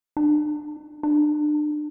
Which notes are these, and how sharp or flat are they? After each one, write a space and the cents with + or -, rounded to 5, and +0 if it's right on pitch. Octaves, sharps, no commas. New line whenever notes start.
D4 +45
D4 +35